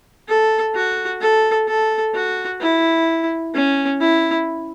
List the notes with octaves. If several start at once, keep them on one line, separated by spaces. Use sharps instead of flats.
A4
F#4
A4
A4
F#4
E4
C#4
E4